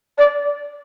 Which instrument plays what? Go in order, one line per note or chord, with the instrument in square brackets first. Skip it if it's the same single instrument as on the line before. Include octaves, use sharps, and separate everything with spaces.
[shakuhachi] D5